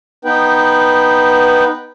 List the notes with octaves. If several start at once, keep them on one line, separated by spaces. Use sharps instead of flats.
B3 D#4 B4 G5